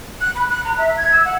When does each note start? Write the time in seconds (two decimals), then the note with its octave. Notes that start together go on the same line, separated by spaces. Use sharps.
0.21 F#6
0.35 B5
0.50 F#6
0.65 A#5
0.78 E5
0.97 G#6
1.12 E6
1.25 F#5